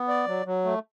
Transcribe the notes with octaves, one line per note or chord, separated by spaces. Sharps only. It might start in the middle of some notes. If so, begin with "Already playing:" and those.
Already playing: B3
D5
F#3
F#3
A3